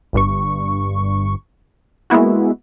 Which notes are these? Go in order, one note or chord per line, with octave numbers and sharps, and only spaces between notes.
G1 G2 C#6
G#3 A#3 B3 E4 F#4